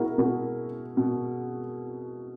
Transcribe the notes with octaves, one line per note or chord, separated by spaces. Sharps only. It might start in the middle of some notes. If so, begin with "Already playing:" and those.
Already playing: B2 E4 F#4 G#4 A#4
B2 F#4 A#4
B2